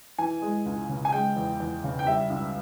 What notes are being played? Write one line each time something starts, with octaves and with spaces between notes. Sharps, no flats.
E3 G#5
G#3
C#2
C#3
G#5
G#3 G5
E2
E2
C#3
G5
G3 E5
C#2